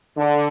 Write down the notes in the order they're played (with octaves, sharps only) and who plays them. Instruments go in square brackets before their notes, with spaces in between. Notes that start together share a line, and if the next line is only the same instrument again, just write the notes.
[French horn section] D3